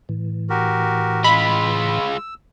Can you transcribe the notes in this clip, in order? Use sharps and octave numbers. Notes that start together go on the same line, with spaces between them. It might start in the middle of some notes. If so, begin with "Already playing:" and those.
A2 E3
F#4 G4 A#4
G#3 F4 B5 E6